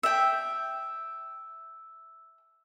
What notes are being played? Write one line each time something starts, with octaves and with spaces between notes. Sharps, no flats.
E5 G5 E6